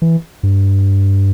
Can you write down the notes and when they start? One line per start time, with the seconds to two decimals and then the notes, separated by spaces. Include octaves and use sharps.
0.02 E3
0.43 G2